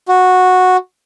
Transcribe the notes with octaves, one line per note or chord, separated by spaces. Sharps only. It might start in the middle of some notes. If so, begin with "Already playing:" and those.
F#4